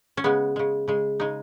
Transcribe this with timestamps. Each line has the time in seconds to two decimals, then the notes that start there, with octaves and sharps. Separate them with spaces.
0.17 C#4
0.24 C#3 G#3 B3
0.56 C#3 G#3
0.88 C#3 G#3
1.20 C#3 G#3 D#4